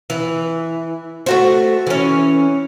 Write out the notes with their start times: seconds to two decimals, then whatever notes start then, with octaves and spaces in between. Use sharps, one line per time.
0.10 E3
1.26 A3 F#4 C5
1.87 E3 C#4